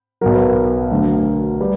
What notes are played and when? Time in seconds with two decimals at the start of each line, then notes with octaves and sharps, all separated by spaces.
0.21 B1 B2 F#3 A#4
0.35 B4
0.48 A#4
0.91 D2 D3 F#3
1.60 G3 B4